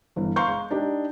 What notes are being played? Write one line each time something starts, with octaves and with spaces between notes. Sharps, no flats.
G1 E3
F5 A#5 C6 C#6 G6
G#3
D4 D#4 G4